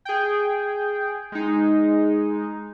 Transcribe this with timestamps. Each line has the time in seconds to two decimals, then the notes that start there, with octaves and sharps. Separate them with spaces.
0.05 G#4 G5
1.32 G#3 D#4